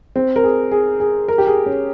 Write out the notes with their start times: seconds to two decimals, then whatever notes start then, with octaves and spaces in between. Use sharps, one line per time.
0.16 C4
0.36 A#4
0.44 G#4
0.71 G#4
1.00 G#4
1.28 A#4
1.38 G4
1.47 G#4
1.66 C#4